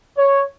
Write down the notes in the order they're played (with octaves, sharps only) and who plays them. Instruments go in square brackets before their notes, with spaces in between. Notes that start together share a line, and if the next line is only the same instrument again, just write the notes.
[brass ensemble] C#5